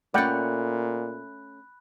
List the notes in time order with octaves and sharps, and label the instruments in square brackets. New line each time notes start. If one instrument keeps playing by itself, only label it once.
[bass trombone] A#2 [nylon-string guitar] A3 C#4 [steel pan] D5 F#5 G5 [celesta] B5 F#6